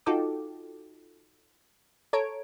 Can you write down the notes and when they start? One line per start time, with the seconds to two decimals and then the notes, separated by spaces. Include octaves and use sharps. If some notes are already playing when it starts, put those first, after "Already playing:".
0.06 D#4 F4 F#4 A4 G5 D6
2.13 A4 C#5 A#5 G#6 D7